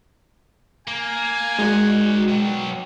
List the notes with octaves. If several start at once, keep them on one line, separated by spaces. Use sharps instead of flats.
A#3 G#5
G#3 D#4 F#4 A#4 D5 F#5
B2 F#3 G5